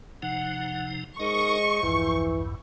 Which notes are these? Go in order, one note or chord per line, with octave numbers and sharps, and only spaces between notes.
C3 F3 D#4 F#5
G#3 D#4 A#4 C5 D#5 C#6
B1 E2 G2 E3 F3